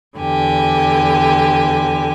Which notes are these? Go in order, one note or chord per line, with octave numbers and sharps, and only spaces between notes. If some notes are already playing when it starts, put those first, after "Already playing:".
E2 D3 G4 G#5